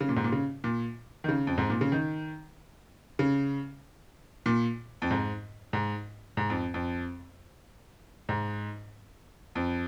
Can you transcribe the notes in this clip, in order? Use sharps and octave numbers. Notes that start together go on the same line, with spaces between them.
C#3
A#2
G#2
A#2
C#3
A#2
D#3
C#3
F2
G#2
A#2
C#3
D#3
C#3
A#2
F2
G#2
G#2
G#2
F2
F2
G#2
F2